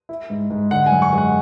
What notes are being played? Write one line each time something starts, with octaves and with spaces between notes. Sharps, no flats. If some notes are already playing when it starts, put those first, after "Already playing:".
E4
G#2
G#2
D3 F#5
G#5
F#2
C#6
G#3
F#5